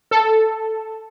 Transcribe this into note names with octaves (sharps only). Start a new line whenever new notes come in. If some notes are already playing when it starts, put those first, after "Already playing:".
A4